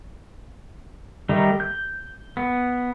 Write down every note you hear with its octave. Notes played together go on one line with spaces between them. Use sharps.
D#3 G3 A3 D#4
G6
B3